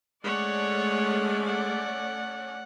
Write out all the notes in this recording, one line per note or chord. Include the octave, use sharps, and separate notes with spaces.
G#3 A3 C#4 C#5 D5 F#5
F#5